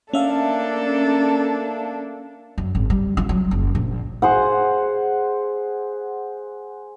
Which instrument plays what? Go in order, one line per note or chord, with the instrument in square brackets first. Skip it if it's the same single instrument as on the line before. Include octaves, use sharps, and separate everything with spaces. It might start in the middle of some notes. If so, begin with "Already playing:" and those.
[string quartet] A#3 D4 A4 [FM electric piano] C#4 E5 F5
[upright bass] F#2
G#1
G3
F4
F#3
F#1
A#1
[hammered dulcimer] G#4 C5 F#5